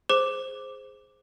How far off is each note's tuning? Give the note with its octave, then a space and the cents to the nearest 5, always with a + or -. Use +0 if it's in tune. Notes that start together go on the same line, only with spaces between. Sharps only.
G#4 +0 C5 +0 D6 +0